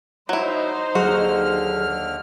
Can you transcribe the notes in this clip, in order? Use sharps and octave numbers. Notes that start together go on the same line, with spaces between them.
F#3 D#4 E4 C5
D#2 D3 F#3 F#4 G#4 F6